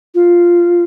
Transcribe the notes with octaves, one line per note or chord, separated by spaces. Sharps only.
F4